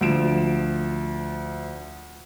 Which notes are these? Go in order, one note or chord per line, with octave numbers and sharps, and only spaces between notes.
D2 F3 D7 E7